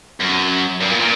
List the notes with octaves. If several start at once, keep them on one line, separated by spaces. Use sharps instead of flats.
F#2
G2
A#2
A#2